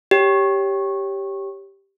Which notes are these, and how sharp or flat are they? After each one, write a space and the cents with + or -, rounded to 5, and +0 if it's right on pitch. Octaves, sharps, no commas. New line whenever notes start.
G4 +0 C#5 +0